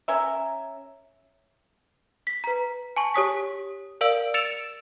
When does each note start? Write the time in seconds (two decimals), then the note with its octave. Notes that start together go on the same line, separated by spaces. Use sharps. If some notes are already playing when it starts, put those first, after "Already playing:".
0.08 C#4 A#4 E5
2.27 B6
2.44 B4 A#5
2.96 G#5 A5 C#6
3.14 G4 C#5 D#6 B6
4.01 A#4 D5 F5 E6 D7 F#7
4.34 E6 A6 C#7 D7 E7 F7